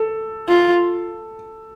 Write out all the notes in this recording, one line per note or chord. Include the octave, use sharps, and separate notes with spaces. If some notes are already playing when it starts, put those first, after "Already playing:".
Already playing: A4
F4